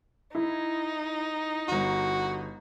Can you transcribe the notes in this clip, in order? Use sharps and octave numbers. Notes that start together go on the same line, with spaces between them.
D#4 E4
G1 F#4 A#5